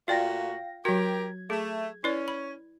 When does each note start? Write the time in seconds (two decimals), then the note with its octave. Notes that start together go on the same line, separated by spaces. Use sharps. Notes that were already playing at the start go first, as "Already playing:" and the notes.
0.08 A#2 A3 F4 F#4 D5 F5 G5 A#6
0.85 F#3 F#4 G4 A#4 G#6
1.50 A3 G#4
2.04 C#4 E4 B4 D5
2.28 B5